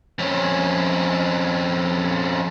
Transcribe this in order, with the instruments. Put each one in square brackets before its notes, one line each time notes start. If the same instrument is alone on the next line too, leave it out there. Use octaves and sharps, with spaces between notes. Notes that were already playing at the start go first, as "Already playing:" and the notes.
[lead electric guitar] F2 C#4